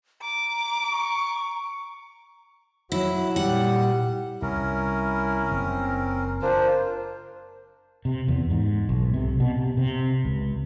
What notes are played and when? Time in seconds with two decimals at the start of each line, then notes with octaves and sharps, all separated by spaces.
0.22 A#5 D6
0.91 C#6
2.92 F#3 E4
3.36 A#2 G3 F#5
4.42 C2 C#4 E4 A#4
5.51 F#1 C4
6.42 D4 F4 A#4 C5
8.05 C3
8.28 E2
8.51 G#2
8.89 B1
9.14 C3
9.40 B2
9.57 C3
9.77 C3
10.25 C#2